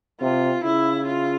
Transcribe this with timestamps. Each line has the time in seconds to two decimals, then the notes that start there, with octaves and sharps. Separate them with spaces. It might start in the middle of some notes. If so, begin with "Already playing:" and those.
0.21 C3 F4
0.64 C#3 E4
1.06 F4